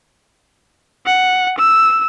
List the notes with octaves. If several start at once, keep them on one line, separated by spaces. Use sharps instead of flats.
F#5
E6